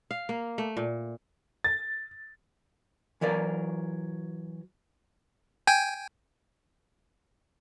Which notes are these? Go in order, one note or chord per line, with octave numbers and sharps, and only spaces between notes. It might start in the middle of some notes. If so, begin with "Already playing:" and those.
F5
A#3
A3
A#2
A6
E3 F#3 A#4 D5
G5 G#5